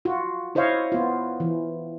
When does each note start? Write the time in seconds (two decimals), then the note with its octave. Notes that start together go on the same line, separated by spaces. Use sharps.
0.05 F4 F#4
0.55 E4 C5 C#5 D#5 F5
0.92 B3 F4
1.40 E3